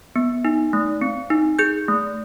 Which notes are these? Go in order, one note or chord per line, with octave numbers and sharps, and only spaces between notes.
B3
D#4
A3
C4
D#4
G#4 G6
A3